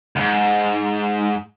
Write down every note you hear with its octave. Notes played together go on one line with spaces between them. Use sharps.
D2 G#2